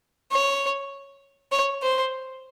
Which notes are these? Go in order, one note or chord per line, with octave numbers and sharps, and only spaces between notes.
C#5
C#5
C5